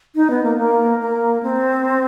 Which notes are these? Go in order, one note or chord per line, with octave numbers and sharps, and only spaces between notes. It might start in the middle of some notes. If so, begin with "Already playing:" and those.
D#4
B3
A#3
A#3
A#3
C4